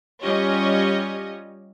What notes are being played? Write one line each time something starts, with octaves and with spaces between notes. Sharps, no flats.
G3 C#4 F4 G4 C#5 D#5